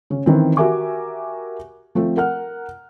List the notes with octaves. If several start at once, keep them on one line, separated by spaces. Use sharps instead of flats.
C#3 C#4
D#3 E3 C4
F#4 G4 A#4 E5 G#5 D6
F3 A3 C4 A4
A#4 F#5 F6